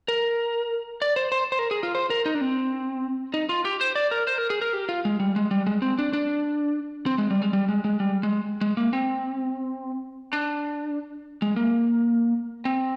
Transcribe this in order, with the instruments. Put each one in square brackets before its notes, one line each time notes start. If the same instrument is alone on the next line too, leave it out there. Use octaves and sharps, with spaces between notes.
[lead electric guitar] A#4
D5
C5
C5
C5
A#4
G#4
F4
C5
A#4
D#4
D4
C4
D#4
F4
G4
C5
D5
A#4
C5
A#4
G#4
A#4
G4
F4
G#3
G3
G#3
G3
G#3
C4
D4
D4
C4
G#3
G3
G#3
G3
G#3
G#3
G3
G#3
G#3
A#3
C4
D4
G#3
A#3
C4